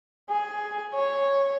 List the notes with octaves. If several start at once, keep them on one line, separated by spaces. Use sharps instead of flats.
G#4
C#5